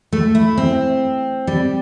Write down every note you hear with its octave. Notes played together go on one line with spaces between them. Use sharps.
A3
E4
C4
G3